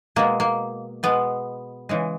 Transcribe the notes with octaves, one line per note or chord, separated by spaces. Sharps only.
B2 G#3 A#3
A#3
B2 G#3 B3
C#3 E3 G#3